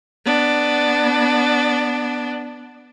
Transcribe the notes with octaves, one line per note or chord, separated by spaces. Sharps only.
B3 D4